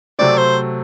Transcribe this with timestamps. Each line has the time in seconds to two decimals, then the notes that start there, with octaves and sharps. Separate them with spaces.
0.19 C3 F#3 A3 C4 D5
0.38 C5